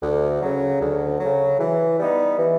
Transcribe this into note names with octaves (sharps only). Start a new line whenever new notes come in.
D2
C#3 F#3
D2
C#3 F#3
E3
G3 B3 D#4
E3